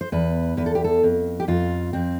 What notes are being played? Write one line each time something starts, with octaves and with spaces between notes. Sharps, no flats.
C5
E2 B4
E2 B4
A4
G4
A4
F2
G4
F2 F4
F2 C4